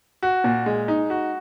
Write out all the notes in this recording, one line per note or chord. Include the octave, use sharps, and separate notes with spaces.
F#4
A#2
G#3
D#4
F#4